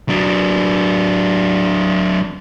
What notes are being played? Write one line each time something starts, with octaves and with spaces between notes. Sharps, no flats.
F#3 D4